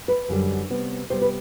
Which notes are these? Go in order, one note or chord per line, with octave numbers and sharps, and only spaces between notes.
B4
F#2 D3 G3
C3 G3 B3
C3 G3 B3 C5
B4